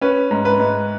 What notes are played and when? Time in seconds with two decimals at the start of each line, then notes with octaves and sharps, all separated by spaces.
0.01 C#4 B4
0.31 G#2
0.45 B4
0.59 G#2